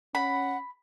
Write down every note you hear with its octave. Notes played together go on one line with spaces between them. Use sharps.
C#4 F#5 B5